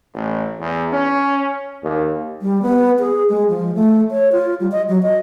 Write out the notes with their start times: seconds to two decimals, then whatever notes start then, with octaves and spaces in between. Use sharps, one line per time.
0.14 A1
0.60 E2
0.93 C#4
1.83 D#2
2.42 G3
2.62 B3
2.99 G#4
3.29 G#3
3.49 F3
3.75 A3
4.11 C#5
4.32 F4
4.60 G3
4.72 D#5
4.88 F#3
5.03 D#5